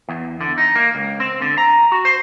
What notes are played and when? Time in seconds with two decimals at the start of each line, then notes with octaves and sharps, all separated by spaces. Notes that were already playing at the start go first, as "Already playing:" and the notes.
0.09 E2
0.41 D3
0.58 D#4
0.75 A#3
0.95 C#2
1.20 C4
1.42 D3
1.58 A#5
1.92 F#4
2.05 C5